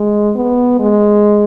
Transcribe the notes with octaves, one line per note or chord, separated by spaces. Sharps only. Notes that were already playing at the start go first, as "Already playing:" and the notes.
Already playing: G#3
B3
G#3